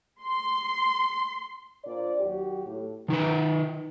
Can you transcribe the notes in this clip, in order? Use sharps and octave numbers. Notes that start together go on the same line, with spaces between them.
C6
A#2 D4 C5 D5
D#2 F#3 F#4 G4
A2
D#3 D#4 A#4 B4